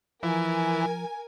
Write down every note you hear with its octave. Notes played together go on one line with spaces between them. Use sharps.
E3 F3 A#4 G#5